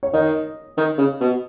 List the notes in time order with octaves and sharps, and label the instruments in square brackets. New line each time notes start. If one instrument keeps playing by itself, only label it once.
[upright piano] C#5
[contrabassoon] D#3 [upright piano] D#5
[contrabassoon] D#3
C#3
B2